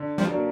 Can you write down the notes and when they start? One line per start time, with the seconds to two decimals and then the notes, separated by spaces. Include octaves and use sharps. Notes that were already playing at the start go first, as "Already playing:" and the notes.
Already playing: D3
0.18 F3 G3
0.30 F#3 A#3 D4